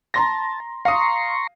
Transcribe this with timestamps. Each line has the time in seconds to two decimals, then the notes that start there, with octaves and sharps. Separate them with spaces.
0.14 A5 A#5 C6 A#6
0.85 F5 A#5 C6 C#6 D#6